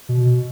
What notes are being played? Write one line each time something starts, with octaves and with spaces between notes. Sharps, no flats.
B2